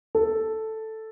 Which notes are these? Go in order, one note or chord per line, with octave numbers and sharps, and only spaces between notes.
A4